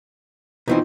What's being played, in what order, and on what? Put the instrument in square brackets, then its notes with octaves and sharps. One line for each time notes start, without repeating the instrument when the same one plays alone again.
[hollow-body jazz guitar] B2 E3 C4 [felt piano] D#4 F4